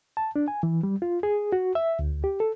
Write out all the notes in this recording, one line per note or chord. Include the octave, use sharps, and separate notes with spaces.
A5
D4
G#5
E3
G3
F4
G#4
F#4
E5
D2
G4
A4